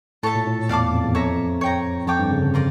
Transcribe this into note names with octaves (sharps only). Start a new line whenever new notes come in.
A2 A4 C#5 E5 A5
A#2
A2
E2 D5 F5 A5 D6
F2
E2
F2 C#5 E5 A#5
C#5 G5 A#5
F2 A4 C#5 G5 D6
G2
C#3
D3
F4 A#4 D5